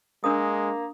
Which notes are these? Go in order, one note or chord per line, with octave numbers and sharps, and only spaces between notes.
G#3 A#3 D4 A#4 D#6